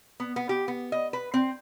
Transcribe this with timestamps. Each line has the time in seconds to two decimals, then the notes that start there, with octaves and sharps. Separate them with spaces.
0.20 B3
0.36 B3
0.49 G4
0.68 B3
0.92 D#5
1.13 B4
1.34 C4